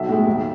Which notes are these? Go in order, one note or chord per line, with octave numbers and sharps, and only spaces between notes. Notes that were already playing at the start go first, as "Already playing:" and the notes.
Already playing: B1 E5
A2 G#3
D#2